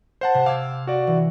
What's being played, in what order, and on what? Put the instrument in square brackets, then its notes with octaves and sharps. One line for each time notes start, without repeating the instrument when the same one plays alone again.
[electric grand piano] C5 F#5 A5
[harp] C3
[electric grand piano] F5 [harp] D6 E6 G#6
[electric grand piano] F#4 D5
[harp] E3